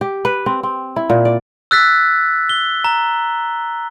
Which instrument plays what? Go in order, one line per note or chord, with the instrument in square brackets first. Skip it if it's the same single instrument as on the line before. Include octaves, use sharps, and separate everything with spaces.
[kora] G4
B4
C4
C4
E4
A#2
D5
[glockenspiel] E6 F#6 A6 B6
G7
A#5